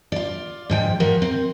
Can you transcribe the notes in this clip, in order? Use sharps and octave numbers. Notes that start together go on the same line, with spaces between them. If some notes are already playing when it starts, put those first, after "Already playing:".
F4 D5
G#2 F3 G5
F3 A#4 F#5
C4